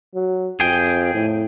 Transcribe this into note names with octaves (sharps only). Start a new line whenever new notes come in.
F#3
F2 G#4 G5
A2